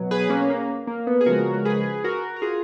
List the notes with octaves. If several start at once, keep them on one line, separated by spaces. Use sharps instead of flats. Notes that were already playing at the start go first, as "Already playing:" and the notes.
Already playing: B2 F#3
G#4 B4
A#3 C#4
A#3
A#3
B3
G#4
C#3 F3 G#3 F#4 A#4
G#4 B4
F#4 A#4
A#4
F4 G#4